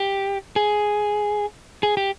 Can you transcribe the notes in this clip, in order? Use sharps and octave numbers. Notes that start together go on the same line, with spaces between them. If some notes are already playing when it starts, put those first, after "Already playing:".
Already playing: G4
G#4
G#4
G4